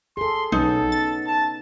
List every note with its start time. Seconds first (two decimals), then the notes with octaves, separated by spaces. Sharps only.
0.17 G#4 A4 C6
0.52 B1 B3 C#4 D#4 A4
0.92 A6
1.27 A5